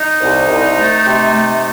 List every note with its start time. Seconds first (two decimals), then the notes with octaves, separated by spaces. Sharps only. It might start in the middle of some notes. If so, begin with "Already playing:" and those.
Already playing: D#4
0.21 C2
0.49 C2
0.76 A3
1.05 C3
1.33 A3